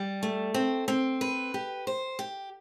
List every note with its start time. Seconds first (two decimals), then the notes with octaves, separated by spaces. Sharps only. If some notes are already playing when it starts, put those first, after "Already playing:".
Already playing: G3
0.23 A3
0.54 C4
0.88 C4
1.21 B4
1.54 G4
1.87 C5
2.19 G4